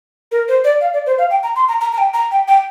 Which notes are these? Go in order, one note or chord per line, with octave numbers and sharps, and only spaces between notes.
A#4
C5
D5
F5
D5
C5
F5
G5
A#5
C6
A#5
A#5
A#5
G5
A#5
G5
G5